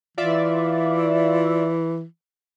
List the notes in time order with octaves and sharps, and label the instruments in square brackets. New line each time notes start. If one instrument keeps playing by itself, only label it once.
[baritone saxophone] E3 [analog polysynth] F4 D5 E5